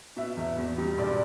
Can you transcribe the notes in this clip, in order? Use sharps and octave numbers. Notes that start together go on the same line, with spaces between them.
B2 E5
E2
E2
G3
E1 D5